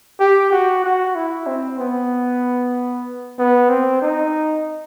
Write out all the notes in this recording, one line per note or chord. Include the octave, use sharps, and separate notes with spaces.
G4
F#4
F#4
E4
C4
B3
B3
C4
D#4